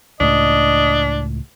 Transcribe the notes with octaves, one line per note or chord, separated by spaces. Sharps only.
C#2 A2 D4 D#5